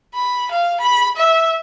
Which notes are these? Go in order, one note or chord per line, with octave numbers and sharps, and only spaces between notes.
B5
F5
B5
E5